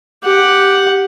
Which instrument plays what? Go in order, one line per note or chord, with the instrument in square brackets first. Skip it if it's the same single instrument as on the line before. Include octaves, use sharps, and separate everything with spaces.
[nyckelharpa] G4 F#5